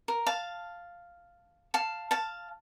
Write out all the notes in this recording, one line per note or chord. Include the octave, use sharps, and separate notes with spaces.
A#4
F5 A5
F5 A5
F5 A5